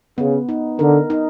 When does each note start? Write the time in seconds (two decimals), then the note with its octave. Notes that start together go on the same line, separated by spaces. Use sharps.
0.18 C#3 B3
0.49 D#4
0.79 D3 A#4
1.10 D#4